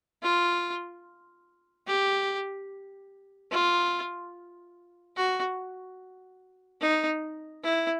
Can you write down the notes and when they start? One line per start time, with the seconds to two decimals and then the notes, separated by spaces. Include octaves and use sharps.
0.23 F4
1.87 G4
3.52 F4
5.16 F#4
6.81 D#4
7.64 E4